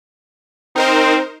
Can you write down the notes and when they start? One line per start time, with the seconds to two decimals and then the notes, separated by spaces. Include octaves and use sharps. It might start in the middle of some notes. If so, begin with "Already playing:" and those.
0.76 C4 D#4 A#4 C5